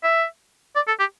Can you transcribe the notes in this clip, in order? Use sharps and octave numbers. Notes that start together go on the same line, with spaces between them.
E5
D5
A4
G4